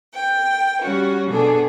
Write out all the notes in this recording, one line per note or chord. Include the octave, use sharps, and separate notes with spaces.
G5
G3 C#4 F#4
B2 D4 G#4 A4